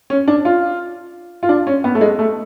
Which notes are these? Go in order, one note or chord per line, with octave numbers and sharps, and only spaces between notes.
C#4
D4
F4
F4
D4
C#4
B3
A3
G#3
A3